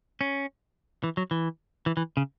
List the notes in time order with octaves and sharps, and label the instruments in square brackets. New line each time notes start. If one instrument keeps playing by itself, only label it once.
[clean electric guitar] C#4
E3
F#3
E3
E3
E3
C#3